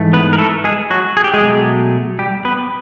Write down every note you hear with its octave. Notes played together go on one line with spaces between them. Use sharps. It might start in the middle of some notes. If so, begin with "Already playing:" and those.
Already playing: G#2 E3 A3
B3 B4
A#4
A3 A4
G#3 G#4
F#3 F#4
G#4
G4
G#3 G#4
B2 F#3 A3
G3 G4
B3 B4